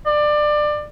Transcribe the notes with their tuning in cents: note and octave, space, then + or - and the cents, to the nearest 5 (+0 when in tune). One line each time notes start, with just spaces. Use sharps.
D5 +20